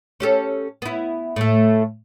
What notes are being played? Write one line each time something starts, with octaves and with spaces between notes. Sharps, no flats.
C#4 G4 A4
B3 E4
A2 A3